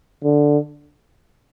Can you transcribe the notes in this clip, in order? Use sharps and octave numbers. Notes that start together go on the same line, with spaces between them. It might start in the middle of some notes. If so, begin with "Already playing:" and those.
D3